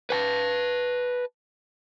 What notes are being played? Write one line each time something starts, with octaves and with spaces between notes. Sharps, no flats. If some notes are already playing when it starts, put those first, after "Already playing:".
B4 G#5 A5